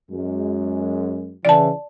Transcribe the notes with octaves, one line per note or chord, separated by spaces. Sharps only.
F#2 G#3
C#3 E3 D5 A5